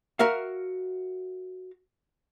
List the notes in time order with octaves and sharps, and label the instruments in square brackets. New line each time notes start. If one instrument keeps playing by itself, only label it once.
[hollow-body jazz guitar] F#4 A#4 E5 F5